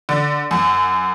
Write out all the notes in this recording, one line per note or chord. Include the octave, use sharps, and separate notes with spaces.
D3
F#2